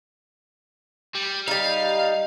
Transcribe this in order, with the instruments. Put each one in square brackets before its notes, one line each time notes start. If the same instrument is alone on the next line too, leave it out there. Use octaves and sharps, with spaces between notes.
[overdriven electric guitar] G3
[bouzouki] G3 D#4 [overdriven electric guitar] F5